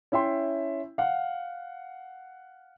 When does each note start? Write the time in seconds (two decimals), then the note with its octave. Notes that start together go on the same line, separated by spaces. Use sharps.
0.12 C#4 E4 E5 G5 C6
0.98 F5 F#5